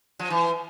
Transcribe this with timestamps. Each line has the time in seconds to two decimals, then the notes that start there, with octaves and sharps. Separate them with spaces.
0.19 F3
0.30 E3